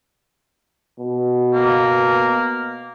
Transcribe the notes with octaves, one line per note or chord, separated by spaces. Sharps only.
B2
A#3